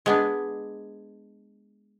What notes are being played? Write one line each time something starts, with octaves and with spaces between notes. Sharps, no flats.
G#3 B3 D4